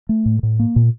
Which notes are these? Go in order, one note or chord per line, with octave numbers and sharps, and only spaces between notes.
A3
A2
A2
A#3
A#2